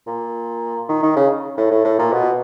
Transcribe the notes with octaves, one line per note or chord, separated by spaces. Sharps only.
A#2
D#3
D#3
C#3
A2
A2
A2
A#2
B2